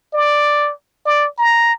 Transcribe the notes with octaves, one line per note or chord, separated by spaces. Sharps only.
D5
D5
A#5